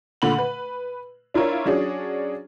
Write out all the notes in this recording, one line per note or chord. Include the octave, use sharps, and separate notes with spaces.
A#2 D3 B5 F#7
B4
D4 E4 F4 A#4 C#5
F#3 C#4 D4 G#4